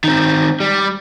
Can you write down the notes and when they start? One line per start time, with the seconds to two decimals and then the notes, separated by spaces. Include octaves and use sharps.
0.04 D#3 C4
0.60 G3